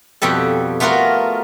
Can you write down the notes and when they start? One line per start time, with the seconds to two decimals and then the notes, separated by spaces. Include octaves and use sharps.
0.22 F2 B2 G3 A4
0.80 A3 B3 F4 F#4 A#4